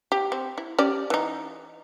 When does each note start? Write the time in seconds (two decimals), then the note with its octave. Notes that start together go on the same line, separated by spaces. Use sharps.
0.12 G4
0.32 C4
0.58 E4
0.78 C#4 G4 D5
1.10 E3 D#4